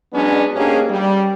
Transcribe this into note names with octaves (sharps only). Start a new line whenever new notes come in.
F#3 G#3 B3 C#4 D4
G#2 A#3 C#4 D4 G4 G#4
G3